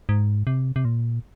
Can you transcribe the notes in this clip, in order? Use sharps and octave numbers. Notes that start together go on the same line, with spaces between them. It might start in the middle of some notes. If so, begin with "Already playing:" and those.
G#2
C3
C3
A#2